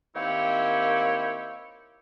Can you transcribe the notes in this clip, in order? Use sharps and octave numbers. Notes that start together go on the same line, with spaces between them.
D#3 A#3 C4 E4 G4 C#5